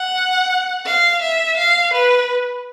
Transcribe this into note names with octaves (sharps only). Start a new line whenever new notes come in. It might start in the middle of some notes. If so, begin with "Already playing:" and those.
Already playing: F#5
F5
E5
F5
B4